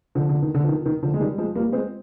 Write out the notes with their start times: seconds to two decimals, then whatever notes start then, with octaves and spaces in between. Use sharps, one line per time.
0.15 D3 F3
0.29 D3
0.42 D#3
0.54 D3
0.64 F3
0.68 D#3
0.86 D#3
1.02 D3 F3
1.14 G#3
1.20 D#3 G3
1.38 F3 G#3
1.55 G3 A#3
1.72 G#3 C4